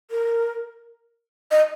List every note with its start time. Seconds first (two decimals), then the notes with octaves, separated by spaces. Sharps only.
0.11 A#4
1.51 D#5